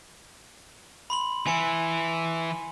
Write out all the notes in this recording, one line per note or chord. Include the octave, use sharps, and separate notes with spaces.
B5 C6 F#7
E3 E4 G#5 C#7